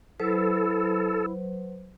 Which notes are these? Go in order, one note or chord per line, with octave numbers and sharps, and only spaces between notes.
F#3 E4 A4 B4 C5